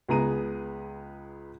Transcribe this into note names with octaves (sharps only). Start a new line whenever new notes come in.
C#2 B3 G#4 A#5 D#7